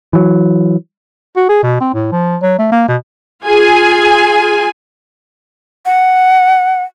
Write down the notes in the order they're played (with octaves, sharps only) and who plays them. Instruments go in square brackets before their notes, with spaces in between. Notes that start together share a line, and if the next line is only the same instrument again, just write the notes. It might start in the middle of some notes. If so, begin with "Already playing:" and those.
[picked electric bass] E3 F#3
[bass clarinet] F#4
G#4
B2
C4
A2
F3
F#3
A3
A#3
B2
[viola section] F4 G#4 G#5
[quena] F#5